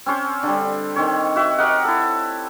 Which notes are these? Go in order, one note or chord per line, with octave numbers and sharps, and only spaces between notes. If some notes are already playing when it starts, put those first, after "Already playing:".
C4 C#4 C5
D3 G3
D#3 C4 C#5
F#4 E5
G4 A#4 D#5 F#5
E4 A4